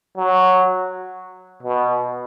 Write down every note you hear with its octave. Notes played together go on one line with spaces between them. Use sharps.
F#3
B2